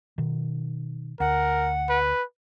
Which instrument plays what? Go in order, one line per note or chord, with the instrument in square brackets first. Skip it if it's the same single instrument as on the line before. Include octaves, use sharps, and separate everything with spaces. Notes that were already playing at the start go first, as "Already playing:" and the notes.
[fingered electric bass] B2 D#3
[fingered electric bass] D2 [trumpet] A#4 [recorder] F#5
[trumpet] B4